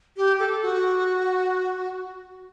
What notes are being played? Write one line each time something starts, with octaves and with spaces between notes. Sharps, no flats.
G4
A4
F#4